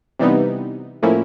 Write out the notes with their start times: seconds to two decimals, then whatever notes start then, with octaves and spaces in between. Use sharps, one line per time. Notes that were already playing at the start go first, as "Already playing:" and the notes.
0.19 C3 E3 G3 B3 D#4
1.02 A2 F3 A#3 C#4 E4